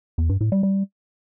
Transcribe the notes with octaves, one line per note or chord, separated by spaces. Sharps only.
E2
G2
A2
G3
G3